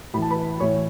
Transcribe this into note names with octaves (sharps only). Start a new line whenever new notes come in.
A2 E3 A5 B5
B4 B5
A2 E3 C#5 C#6